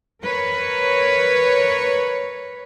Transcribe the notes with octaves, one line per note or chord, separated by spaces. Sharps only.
A#4 B4 C#5